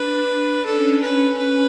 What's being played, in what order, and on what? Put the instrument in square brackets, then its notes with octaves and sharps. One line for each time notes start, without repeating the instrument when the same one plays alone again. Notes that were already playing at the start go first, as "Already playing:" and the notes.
Already playing: [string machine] D4 [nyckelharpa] B4
[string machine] D4
[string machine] C#4 [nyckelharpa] A4
[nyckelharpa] B4
[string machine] C#4 [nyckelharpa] B4